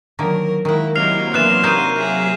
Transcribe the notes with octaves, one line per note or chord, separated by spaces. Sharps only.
D3 D#3 F#3 A#3 A#4
D#3 G#3 A#3 E4 F#5
C3 F#3 A#3 D#4 E4 F6 C7 F7
E3 B3 D4 C6 F#6 E7
D#4 A#4 C#5 G6 D#7
G#4 E5